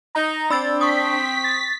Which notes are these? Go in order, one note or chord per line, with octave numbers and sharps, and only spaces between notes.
D#4 A#5
C4 D4 B5 E6 A6
C#6 D#6 B6
A6